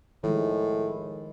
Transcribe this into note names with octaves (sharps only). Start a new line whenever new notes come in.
A2 D#3 F3 G#3